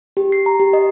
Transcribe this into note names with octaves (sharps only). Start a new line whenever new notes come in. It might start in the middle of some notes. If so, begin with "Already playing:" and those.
G4
C7
A#5
G4
D#5